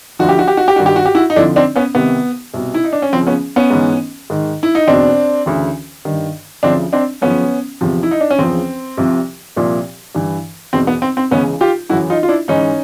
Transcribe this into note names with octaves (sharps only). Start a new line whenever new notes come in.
D2 D3 F3 F#4
G4
F#4
G4
F#4
G4
G2 D#3 F#4
G4
F#4
G4
E4 F#4
D#4
F2 D3 F3 D4 E4
C4 D4
B3 C#4
C2 C3 D#3 B3
C2 B2
E4
D#4
D4
C#4
C#2 C#3 F3 C4
B3 C#4
B3 C#4
G#2 E3
G#2 D#3
E4
D#4
E2 B2 C4 D4
D2 C#3 E3
G2 D#3
D2 C#3 F3 C4 D4
C4 D4
F#2 C#3 F3 B3 C#4
E2 C3 F3
E4
D#4
D4
C#4
E2 C#3 F3 C4
C2 C3 F3
C2 A#2 F3
G2 E3
E2 B2 C4
B3
C4
C4
C#2 C#3 E3 B3 C#4
F4 G4
F#2 C#3 E3 E4 F#4
D#4 F4
F4
D4 E4
G#2 E3 C#4 D#4